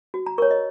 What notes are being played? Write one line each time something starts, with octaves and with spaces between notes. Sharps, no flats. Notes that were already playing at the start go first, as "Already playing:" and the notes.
F#4
A#5
A#4 C#5 C#6
D#5